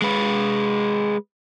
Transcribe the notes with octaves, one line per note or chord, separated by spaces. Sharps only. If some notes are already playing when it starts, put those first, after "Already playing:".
G#3 B4